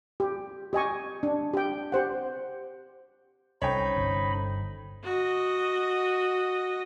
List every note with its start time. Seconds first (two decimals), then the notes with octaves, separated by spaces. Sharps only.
0.20 G4
0.73 G4 D#5 G#5 C#6
1.23 D4
1.54 G4 G5
1.92 G4 C5 F#5
3.62 C2 C#4 D#4 A4 C5 C#5 G5 B5
3.96 G1
5.04 F#4 D#5